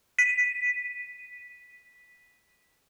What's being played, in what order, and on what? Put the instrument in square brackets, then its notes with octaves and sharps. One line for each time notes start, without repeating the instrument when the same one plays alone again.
[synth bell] B6 D#7